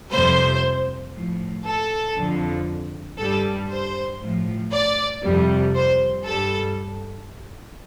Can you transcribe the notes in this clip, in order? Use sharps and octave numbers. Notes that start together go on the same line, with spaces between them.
F2 C3 G3 C5
A2 F3
A4
F2 D3 F3
G2 G3 A4
C5
A2 F3
D5
F2 C3 G3
C5
G2 G3 A4